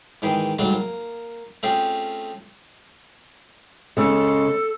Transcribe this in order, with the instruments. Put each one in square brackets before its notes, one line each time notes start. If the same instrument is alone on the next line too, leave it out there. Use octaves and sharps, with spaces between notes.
[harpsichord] G#2 D#3 E3 G4 G#4
G#2 F#3 G3 A3 D4
A#3
A3 C4 C#4 F4 G4 G#4
[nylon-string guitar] C#3 G#3 [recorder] A4